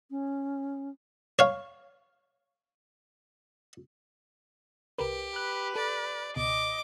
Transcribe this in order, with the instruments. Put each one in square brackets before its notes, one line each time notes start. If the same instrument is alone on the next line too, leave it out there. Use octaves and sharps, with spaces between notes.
[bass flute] C#4
[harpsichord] C#5 F5
[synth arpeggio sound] C2 A#4 B4 [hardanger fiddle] G4
[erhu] B4 [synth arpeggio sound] F#6
[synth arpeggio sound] A4 [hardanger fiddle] D5
[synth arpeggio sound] C#2 B2 [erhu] D#5 [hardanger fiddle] D6